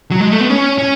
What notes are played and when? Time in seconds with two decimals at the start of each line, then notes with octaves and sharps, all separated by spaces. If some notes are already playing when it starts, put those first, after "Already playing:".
0.11 F#3
0.20 G#3
0.30 A3
0.40 B3
0.50 C#4
0.78 C#4